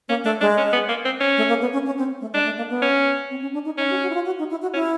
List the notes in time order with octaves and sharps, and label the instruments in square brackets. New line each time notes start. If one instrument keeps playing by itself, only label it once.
[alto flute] A#3 [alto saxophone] C#4
[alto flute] A3 [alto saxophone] D4
[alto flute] G#3 [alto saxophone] D4
[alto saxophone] C#4
B3
A#3
C4
C#4
[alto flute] A3
A#3
B3
C#4
C#4
C4
A3
[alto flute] G#3 [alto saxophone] D4
[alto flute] A3
A#3
B3
[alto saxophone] C#4
[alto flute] C4
C#4
D4
D#4
[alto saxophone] C#4 [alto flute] D#4
[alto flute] F#4
F#4
E4
F4
F#4
D#4
E4
F#4
[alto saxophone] C#4 [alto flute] E4